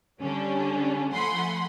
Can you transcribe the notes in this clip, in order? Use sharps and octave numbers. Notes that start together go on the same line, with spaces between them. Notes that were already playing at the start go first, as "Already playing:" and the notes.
D3 G3 C#4 D4
F3 A3 F#5 G#5 B5 C6